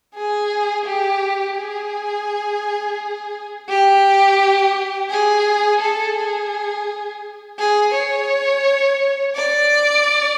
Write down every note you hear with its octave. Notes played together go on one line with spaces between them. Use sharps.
G#4
G4
G#4
G4
G#4
A4
G#4
G#4
C#5
D5